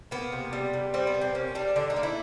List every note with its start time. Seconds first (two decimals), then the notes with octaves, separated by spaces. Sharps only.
0.11 A#3 B3
0.32 C3
0.53 G3
0.73 C3
0.94 G3 C4
1.07 B3
1.14 C3
1.21 C4
1.35 A#3 C#4
1.55 G3 D4
1.76 D3 D4
1.90 D#4
1.96 A#3
2.03 E4